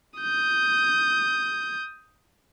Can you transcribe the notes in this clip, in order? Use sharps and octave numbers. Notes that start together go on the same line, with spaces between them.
D#6 G6